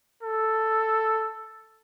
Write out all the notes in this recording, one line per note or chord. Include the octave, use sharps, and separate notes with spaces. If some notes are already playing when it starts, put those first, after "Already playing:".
A4